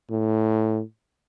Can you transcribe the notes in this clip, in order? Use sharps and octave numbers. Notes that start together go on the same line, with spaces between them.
A2